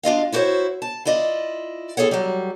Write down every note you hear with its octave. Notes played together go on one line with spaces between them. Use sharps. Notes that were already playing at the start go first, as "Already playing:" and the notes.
D4 F4 D#5 F5
E4 F#4 G4 A#4 C5 C#5
A5
E4 F4 D5 D#5
E4 G#4 A4 C#5 F#5
F#3 G3